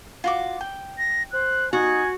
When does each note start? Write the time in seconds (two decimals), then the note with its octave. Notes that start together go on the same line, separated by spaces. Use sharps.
0.24 F4 F#4 D6
0.61 G5
0.98 A#6
1.33 C5 F#6
1.73 D#4 F#4 G#5